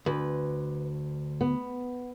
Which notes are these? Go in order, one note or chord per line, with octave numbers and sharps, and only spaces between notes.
D2 B4
B3